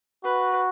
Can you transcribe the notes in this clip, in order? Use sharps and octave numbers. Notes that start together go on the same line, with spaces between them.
F#4 B4